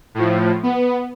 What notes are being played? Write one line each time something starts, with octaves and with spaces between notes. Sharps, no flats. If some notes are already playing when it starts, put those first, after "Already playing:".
A2 F3
B3